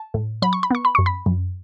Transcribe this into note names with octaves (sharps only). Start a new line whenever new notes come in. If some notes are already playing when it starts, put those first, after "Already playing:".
Already playing: A5
A2
F#3 B5
C#6
B5
B3 C#6
B5
F#2 C#6
B5
F#2